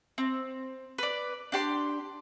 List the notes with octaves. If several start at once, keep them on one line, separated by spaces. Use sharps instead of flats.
C4
B4 D5
D4 G4 C6